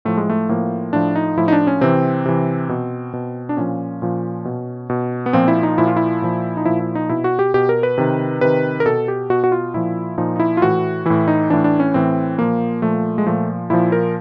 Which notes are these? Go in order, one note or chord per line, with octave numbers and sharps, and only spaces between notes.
A2 F3 A3
G#3
A3
A2 F3 A#3
A2 F3 D4
D#4
A2 F3 E4
D#4
D4
C#4
C3 E3 C4
C3 E3
B2
B2
D4
A#2 F3 C#4
A#2 F3
B2
B2
B3
A#2 F3 C4
E4
D#4
A#2 F3 E4
F4
E4
A#2 F3
D#4
A#2 F3 E4
E4
D#4
B2 E4
F#4
G4
B2 G4
A#4
B4
C3 D#3
C3 D#3 B4
A#4
B2 A4
G4
B2 F#4
F#4
F4
A#2 F3 E4
A#2 F3 D#4
D#4
E4
F4
A2 E3 F#4
A2 E3 E4
D#4
A2 E3 D4
D4
C#4
A2 E3 C4
A#2 F3 A#3
A#2 F3 A3
G#3
A#2 F3 A3
A#2 F3 E4
A#4